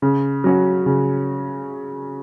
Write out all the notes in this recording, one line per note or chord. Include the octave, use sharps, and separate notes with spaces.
C#3
F#3 C#4 F#4
C#3